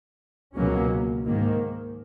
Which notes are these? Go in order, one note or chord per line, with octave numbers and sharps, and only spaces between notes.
C#2 B2 F#3 A#3 C#4
G#2 D#3 A#3